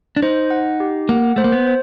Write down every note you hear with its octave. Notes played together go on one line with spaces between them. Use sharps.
D4
D#4 C5
F#5
G4
A#3 F#5
A3 C5
A#3
B3
C5